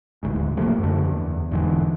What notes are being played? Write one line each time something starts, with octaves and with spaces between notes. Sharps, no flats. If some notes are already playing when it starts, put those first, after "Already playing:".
D#1 A1 D2 G#2
C3 F3 A3 A#3
F#2 D3
E2
E1 G#2 D3 E3